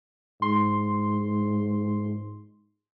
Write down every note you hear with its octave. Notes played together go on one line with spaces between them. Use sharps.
G#2 C6